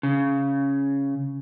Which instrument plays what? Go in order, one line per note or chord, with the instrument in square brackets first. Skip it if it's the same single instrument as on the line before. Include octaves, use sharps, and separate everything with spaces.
[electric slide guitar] C#3